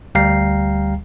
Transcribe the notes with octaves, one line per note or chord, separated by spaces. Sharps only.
D2 G3 F5 G5 A#5 C7